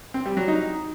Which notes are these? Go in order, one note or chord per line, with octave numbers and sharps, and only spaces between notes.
C4
G3
F#3
D#4